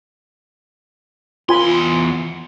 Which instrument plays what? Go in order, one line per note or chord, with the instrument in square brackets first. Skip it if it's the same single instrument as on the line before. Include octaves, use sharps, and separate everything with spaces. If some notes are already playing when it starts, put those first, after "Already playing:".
[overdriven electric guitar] E2 C6 [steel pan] F4 G#5 B5